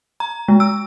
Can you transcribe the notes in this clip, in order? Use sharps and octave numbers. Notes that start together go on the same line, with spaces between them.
A#5
G#3
E6